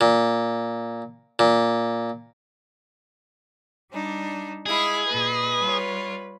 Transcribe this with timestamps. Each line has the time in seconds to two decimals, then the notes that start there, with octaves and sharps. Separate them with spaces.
0.01 A#2
1.39 A#2
3.92 G3 D4 D#4
4.66 G#3 E4 G#4 F5 B5
5.09 A#2 B4 D#5
5.60 G3 F4 C#5